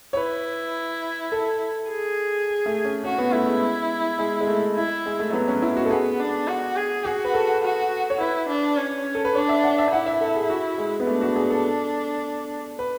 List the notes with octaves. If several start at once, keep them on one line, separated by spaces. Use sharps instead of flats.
C#5
E4 B4
A4
G#4
A3
C#4
C#4 F#4
B3
A3 E4
G#3
G#3
G#3
A3
E4
G#3
A3
F#3 B3
C#4
G#3 E4
F#4
A4
B3 G#4
D4
F#4
G#4
F#4 G#4
B4
A4
F#4
C#5
E4 B4
D4
C#4
A4
B4
D4 C#5
E5
F#5
E5
E4 F#5
E5
A4
G#4
F#4
G#3
B3
A3 D4
F#4
G#4
A4
B4